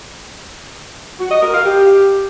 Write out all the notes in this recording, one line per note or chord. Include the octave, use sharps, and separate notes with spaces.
F#4
D#5
A#4
F5
G4